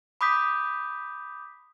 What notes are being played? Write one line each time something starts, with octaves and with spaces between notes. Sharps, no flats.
B5 D6 D#6 G6 B6